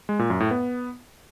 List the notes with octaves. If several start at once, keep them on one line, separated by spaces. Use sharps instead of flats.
G#3
A#2
F#2
A2
B3